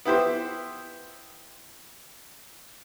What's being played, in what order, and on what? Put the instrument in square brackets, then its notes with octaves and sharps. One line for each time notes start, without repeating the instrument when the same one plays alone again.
[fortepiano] B3 E4 G4 C5